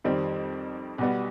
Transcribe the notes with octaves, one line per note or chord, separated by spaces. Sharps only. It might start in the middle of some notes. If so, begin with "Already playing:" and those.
F2 D#3 G3 C4
B1 B2 G3 B3